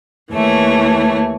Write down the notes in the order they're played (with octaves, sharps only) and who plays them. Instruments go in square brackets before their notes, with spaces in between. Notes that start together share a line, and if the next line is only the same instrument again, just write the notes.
[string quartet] D#2 E3 A3 C#5